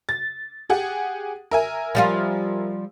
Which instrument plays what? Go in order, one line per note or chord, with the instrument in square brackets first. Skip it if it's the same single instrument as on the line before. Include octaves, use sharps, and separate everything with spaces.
[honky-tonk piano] A6
G4 G#4 F#5
A#4 E5 G#5
[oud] F3 G3 F4